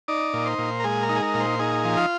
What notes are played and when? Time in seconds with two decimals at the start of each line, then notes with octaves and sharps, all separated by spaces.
0.08 D#4 D5
0.33 A#2
0.46 C5
0.58 A#2
0.80 A#4
0.84 G#3 G#4
1.03 A#4
1.09 D#4
1.16 G#4
1.22 A#4
1.34 A#2
1.40 C5
1.59 D#4 G#4
1.85 F3
1.97 F4